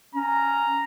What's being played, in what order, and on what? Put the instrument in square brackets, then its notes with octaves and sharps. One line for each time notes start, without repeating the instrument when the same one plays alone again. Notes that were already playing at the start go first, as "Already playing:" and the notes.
[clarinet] C#4 [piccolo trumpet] A#5